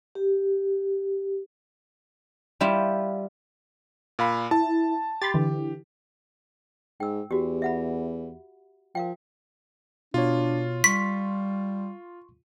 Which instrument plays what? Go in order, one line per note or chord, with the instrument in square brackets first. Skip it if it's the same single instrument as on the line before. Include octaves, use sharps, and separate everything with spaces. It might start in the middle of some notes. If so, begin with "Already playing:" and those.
[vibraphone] G4
[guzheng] G3 E4 F4
[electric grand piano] A#2 F5 B5
[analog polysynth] E4 [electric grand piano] A5
[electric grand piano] G4 [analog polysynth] B5 C6 A6
[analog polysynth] D3 E3
[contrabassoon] G#2 [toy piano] G5 E6
[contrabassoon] E2 [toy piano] F#4 G4
[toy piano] E5 F#5 B5
[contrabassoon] F3 [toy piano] A#4 F5 G5
[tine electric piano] B2 C#5 [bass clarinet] D4 [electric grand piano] F4
[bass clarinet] G3 [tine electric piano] C6 C#6 [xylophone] B6